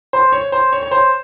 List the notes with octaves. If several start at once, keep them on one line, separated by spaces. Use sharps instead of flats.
C5
C#5
C5
C#5
C#5
C5